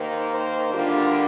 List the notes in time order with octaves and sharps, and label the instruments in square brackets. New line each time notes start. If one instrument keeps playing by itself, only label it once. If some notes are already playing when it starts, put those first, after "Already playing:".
Already playing: [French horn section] D#2 D#3 A#3 C5
C5
D2 D3 G3 A#3 D4 F4